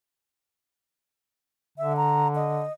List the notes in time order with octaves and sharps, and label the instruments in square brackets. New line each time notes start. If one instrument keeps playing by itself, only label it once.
[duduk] D3 [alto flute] E5
[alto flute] A#5
D#5